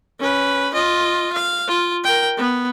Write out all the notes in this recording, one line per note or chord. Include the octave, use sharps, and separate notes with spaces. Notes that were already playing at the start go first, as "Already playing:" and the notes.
C#4 B4
F4 D#5
F5
F4
A#4 G5
B3